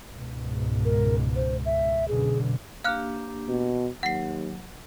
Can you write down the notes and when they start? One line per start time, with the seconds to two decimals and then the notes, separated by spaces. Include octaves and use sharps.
0.15 C#2 G#2 B2
0.85 A#4
1.35 C5
1.65 E5
2.08 F#2 B2 D3 G#4
2.84 A#3 D4 G4 F5 F6 F#6
3.49 B2
4.03 D#2 F#3 F#5 C7